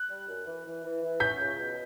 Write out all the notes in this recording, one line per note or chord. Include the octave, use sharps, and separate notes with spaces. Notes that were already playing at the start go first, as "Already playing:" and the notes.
Already playing: F#6
G3
F#2
E3
E3
E3
E3
C#4 G6 B6
C#2
B2